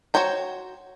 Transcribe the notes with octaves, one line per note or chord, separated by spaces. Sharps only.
F#4 C5 C#5 G5 A#5